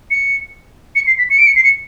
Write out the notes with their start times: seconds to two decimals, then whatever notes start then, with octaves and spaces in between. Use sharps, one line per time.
0.11 C#7
0.96 C#7
1.07 C7
1.18 B6
1.30 C#7
1.38 D7
1.47 C#7
1.56 C7
1.64 C#7